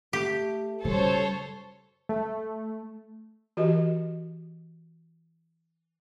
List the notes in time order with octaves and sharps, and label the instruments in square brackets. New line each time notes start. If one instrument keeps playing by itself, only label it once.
[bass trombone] A3 [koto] G4
[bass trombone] F#2 [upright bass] C#3 G3 [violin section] A4 C5 C#5
[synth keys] A3
[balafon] E3 F#4 G4 A#4 D#5